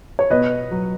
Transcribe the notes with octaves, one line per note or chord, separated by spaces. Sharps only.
C#5
B2 B4 D#5
F#3